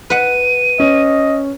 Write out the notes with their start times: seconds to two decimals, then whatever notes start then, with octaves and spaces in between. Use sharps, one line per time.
0.10 B4 F#5 D#7
0.80 C#4 D#5